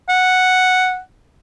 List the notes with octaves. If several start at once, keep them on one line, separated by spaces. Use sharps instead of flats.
F#5